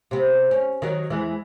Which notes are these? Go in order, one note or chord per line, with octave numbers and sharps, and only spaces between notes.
C3 B3
C#4
D#3 F#3
E2 E3 G#3